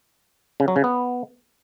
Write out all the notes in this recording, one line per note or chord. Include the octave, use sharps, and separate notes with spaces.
C#3
F#3
C#3
B3